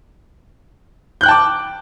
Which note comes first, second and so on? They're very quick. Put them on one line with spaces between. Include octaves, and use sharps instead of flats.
G6 F#6 G5 A5 D6